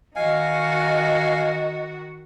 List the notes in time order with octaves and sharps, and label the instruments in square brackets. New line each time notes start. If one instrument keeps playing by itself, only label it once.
[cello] D#3 F#4 [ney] D#5 [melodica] F5 G#5